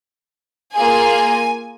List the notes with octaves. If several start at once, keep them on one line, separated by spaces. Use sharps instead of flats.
A#3 F4 G#4 G#5